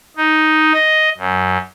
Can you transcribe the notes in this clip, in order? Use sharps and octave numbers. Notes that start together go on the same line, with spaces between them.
D#4
D#5
F#2